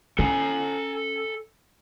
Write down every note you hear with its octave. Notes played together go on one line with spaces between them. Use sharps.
C#4 A4 G#5